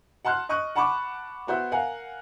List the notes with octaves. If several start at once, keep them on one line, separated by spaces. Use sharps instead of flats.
F#5 A5 C6 F6 F#6
D#5 C#6 D#6 F#6 D#7
F#5 A5 B5 C#6 D6
B3 F#4 C5 E5
A#4 F5 F#5 G#5